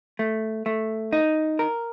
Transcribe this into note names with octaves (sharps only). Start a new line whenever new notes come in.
A3
A3
D#4
A#4